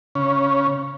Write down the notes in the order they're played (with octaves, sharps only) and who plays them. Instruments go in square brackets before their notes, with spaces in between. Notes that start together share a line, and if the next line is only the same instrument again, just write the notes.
[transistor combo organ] C#3 C#4